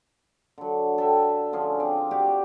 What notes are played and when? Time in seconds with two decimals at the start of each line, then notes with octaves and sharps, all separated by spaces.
0.58 D3 F#3
0.98 A4 E5 G5
1.53 D3 F3 C#4 G#4
1.80 C4 D5
2.11 F#4 G4 D5 D6